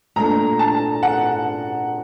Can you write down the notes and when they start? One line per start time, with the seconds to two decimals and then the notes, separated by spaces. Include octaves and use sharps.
0.16 A#2 A3 D4 A#5
0.59 A5
1.03 F#5